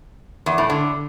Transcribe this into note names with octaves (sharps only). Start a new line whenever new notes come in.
E2
A2
D3